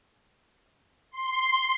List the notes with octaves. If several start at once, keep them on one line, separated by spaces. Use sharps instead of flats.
C6